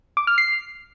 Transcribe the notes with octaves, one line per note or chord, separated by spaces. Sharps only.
D6
F6
C7